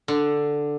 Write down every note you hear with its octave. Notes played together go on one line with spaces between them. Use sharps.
D3